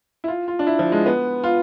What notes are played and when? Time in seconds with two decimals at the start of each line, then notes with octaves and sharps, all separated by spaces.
0.24 E4
0.28 F4
0.48 F4
0.59 D4
0.67 E4
0.79 F3
0.92 G#3
1.06 B3
1.44 F4